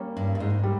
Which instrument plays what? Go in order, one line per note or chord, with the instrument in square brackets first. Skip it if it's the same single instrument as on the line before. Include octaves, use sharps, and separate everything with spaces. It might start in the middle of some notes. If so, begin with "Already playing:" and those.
Already playing: [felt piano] G3 A#3 C#4
[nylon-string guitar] G2
G2
G#2
[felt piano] G3